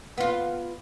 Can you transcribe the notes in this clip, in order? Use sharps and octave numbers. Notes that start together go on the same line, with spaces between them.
B3 F4